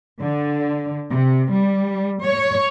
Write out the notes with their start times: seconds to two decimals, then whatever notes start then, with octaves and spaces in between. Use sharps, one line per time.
0.21 D3
1.10 C3
1.52 G3
2.22 C#5